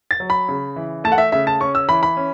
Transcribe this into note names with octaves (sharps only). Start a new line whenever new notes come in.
A6
F#3
B5
C#3
E3
A3 A5
F#5
E5
C#3 E5
A5
C#4 C#6
E6
E3 B5
B5
C#4